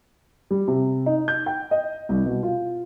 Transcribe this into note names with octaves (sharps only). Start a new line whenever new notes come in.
G3
C3
D#4
G6
G5
D#5
C2
B2
F4